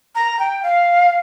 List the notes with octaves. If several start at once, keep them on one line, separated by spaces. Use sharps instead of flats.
A#5
G5
F5